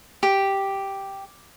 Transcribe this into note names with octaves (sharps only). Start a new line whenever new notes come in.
G4